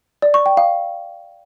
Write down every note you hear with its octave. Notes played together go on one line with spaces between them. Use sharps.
D5
C#6
G5
F5